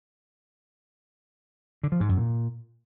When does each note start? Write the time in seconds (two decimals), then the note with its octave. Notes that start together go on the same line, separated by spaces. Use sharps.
1.83 D3
1.92 F3
2.00 G#2
2.09 F#2
2.17 A#2